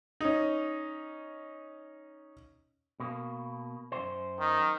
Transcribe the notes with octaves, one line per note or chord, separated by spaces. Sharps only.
C#4 D#4
B2 A#3
F#2 B2 C5
D#3